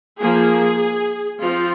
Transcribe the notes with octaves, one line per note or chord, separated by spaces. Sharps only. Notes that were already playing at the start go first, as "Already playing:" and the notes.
F3 A#3 G#4
F3 C4 F4